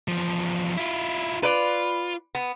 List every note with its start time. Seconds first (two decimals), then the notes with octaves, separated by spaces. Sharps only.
0.08 E2 F3
0.77 E4 F4
1.43 F4 B4 D5
2.35 B3